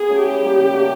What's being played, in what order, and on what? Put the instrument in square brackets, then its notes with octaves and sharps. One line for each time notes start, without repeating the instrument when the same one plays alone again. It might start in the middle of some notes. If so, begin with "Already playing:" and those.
Already playing: [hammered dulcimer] B3 [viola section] G#4
[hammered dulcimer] F#3 A3 C#4
[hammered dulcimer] E3 [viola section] G4
[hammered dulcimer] G3 A#3
C#3
F#3 A3 D4